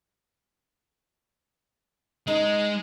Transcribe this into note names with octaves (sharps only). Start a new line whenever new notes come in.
G#3 D#4